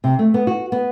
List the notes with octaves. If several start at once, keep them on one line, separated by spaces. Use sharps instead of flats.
C3
A3
B3
F#4
B3